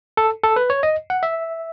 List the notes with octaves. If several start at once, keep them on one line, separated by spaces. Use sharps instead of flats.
A4
A4
B4
C#5
D#5
F#5
E5